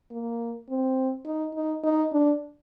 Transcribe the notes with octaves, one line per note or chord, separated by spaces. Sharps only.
A#3
C4
D#4
D#4
D#4
D4